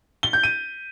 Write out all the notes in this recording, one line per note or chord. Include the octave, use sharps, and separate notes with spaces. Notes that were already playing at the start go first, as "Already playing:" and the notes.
G7
G6
D#7